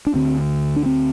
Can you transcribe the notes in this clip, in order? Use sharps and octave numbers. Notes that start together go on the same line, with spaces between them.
D4
D2 D3 C4
D4
C4